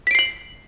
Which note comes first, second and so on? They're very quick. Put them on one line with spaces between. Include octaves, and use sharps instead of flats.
B6 D7 C7 F#7